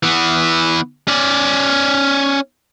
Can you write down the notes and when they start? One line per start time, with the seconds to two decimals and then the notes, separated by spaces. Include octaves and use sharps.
0.03 E3 B3
1.08 C#4 D5